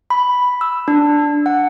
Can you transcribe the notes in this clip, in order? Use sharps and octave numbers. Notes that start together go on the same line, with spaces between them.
B5
E6
D4
F#5